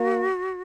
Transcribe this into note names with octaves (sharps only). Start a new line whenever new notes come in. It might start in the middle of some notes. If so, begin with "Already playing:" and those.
Already playing: A#3 F#4